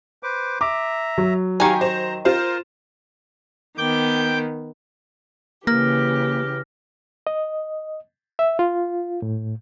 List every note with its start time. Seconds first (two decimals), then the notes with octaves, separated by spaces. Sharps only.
0.23 B4 C5 D6
0.61 E5 A#5 D6
1.18 F#3
1.60 D#3 G4 C#5 F5 G#5 A#5
1.81 C5 A#5
2.25 F4 A#4 C5
3.78 D#3 B3 G5 D6 G6
5.67 C#3 E3 A#3 G4 F6 A#6
7.27 D#5
8.39 E5
8.59 F4
9.22 A2